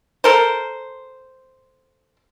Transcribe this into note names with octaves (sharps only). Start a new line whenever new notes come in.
A4 A#4 C5